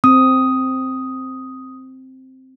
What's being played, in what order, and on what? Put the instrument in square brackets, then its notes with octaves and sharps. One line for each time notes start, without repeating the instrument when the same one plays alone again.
[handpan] C4 [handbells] D#6